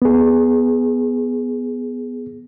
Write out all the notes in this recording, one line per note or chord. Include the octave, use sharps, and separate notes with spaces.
B3 G#4